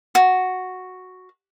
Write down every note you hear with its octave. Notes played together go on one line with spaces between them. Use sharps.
F#4